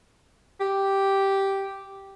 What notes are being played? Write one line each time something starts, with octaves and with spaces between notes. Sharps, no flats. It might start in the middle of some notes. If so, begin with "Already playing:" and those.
G4